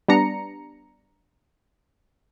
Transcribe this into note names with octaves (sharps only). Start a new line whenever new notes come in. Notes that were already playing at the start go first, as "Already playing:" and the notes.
G3 B3 D4 A#5 C#7